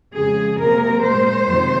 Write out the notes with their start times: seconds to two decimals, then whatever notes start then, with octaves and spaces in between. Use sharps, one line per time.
0.14 F2 C#3 G#3 G#4
0.59 C3 F#3 A#3 A#4
1.04 A#2 G#3 C5
1.48 F2 C3 D#3 F#3